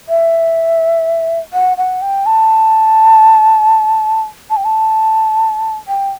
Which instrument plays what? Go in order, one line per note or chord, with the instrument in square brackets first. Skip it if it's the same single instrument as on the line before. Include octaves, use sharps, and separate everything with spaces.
[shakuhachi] E5
F#5
F#5
G5
A5
A5
G5
A5
G5